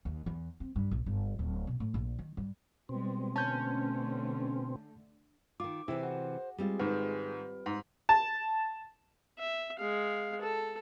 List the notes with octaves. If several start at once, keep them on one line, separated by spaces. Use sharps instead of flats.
D#2
E2
C4
G2
A#1
G1
D1
B2
A2
A#1
D#3
G2
B2 G3 G#3 C4
D3 A3 C#4 A5 G6
D#3 F4 D6
C3 E3 E4 G#4 C5
F#4
G3 G#3 C4 F4
G#2 D#3 B4
G#2 D#4
A5
E5
G#3 F5
A4